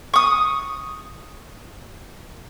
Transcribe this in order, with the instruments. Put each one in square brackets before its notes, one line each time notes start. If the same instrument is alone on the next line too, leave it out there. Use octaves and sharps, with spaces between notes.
[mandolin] C#6 D#6